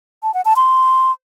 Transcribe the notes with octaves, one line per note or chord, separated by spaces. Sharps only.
A5
F#5
A5
C6